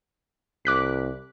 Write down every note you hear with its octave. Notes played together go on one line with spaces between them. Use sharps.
C2 D6 F#6 B6